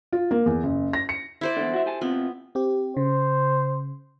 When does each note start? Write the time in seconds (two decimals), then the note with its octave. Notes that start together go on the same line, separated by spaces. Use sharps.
0.13 F4
0.31 A#3
0.46 E2
0.63 F#1
0.93 A#6
1.09 C#7
1.41 E4 C5 D5
1.57 E2 D3
1.73 F#4 E5
1.86 G4 G#5 A5
2.01 C3 B3 C4 F4
2.55 C4 G4
2.97 C#3 C5